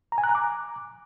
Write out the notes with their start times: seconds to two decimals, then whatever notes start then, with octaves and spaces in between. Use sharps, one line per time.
0.12 A#5
0.18 G#5
0.24 F#6
0.29 A#5
0.35 D6